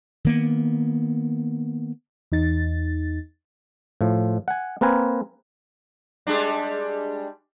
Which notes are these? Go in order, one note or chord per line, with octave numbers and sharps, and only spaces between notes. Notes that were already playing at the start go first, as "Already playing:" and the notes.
D#3 A#3 B3
E2 D#4 A6
A2 F3
F#5 G#5
A#3 C4 A#4 B4 G#5 A#5
G3 G#3 D4